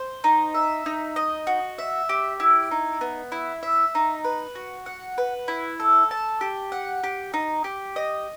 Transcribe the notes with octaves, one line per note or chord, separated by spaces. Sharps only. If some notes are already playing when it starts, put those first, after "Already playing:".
Already playing: C5
D#4
E5
D#4
D#5
F#4
E5
G4
E4
D#4
B3
E4
E5
D#4
B4
F#4
F#5
B4
E4
A4
A5
G4
F#5
G4
D#4
G4
D#5